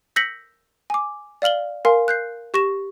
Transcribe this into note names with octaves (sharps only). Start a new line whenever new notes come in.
E6 G6 A#6 B6 C#7 F#7
G#5 D6
D5 F5 F6 F#7 G7
A#4 F5 G#5 C6
F#6 G6 C7
G4 C#6 A#6 E7